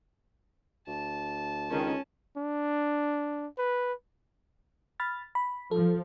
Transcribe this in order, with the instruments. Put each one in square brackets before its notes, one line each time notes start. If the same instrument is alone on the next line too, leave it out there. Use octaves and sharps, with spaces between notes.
[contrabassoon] D2 [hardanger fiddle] A5
[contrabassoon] C#2 [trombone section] D3 D#3 [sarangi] C#4
[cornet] D4
B4
[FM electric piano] B5 F6 A6
B5
[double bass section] F3 [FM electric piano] A4